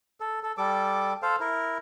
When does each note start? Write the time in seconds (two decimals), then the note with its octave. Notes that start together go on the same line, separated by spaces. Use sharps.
0.20 A4
0.43 A4
0.58 G3 A4 D6
1.22 A4 C5 F5
1.40 E4 A#4